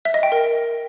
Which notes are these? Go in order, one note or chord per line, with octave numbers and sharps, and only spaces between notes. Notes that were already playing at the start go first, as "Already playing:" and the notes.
E5
D#5
G5
A#4